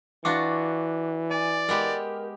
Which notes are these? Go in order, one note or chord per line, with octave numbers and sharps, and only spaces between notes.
E3 D4 F4 F#4 F#5 C#6 D6
D5 G#5
G#3 B3 G4 A#4